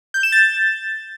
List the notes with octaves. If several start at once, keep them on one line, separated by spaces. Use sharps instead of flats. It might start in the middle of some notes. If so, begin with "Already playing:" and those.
G6
E7
A6